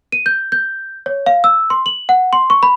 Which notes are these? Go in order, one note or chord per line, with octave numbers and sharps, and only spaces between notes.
D#7
G6
G6
C#5
F5
E6
C6
F#7
F#5
C6
C#6
B5